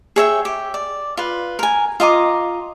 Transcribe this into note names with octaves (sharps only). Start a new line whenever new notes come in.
G#4 C#5 E5 G5
G4
D5
F4 B4
A#4 G#5
F4 D#5 A#5 D6